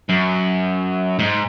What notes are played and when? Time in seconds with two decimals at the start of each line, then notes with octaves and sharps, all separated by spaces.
0.09 F#2
1.19 G#2